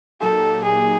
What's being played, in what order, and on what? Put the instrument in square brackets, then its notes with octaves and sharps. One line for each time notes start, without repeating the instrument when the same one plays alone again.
[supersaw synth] A#2 F#3 A#3 D#4 G4 [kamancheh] A4
[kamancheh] G#4